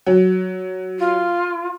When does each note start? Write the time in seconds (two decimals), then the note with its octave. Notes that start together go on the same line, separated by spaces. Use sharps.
0.07 F#3
0.99 F4